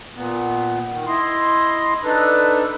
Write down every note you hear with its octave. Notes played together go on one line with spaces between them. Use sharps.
A#2 B3
D#3
E4 D#5 C6
D4 D#4 A4 B4